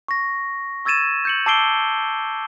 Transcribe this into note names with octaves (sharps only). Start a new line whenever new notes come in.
C#6 A#6
C#6 E6 G#6 A6 D#7 E7
G6 C#7 F#7
A5 D6 E6 C7 D7 G7